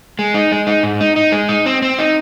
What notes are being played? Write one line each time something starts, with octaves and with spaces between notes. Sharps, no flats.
G#3
D#4
G#3
D#4
G#2
D#4
D#4
G#3
D#4
C4
C4
D#4